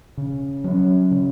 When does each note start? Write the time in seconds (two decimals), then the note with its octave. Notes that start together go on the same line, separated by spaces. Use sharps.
0.18 C#3
0.64 F#3 C#4
1.11 C#3